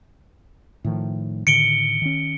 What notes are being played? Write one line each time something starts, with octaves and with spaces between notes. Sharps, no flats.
A2 D#3 F3
A2 D3 D#3 C#7 D7 G7
D#3 C#4